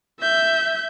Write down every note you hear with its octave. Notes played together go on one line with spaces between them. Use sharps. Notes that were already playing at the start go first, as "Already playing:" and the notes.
E5 G6